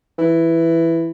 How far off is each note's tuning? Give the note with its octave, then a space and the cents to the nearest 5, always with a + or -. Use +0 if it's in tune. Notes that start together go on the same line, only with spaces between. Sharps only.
E3 +5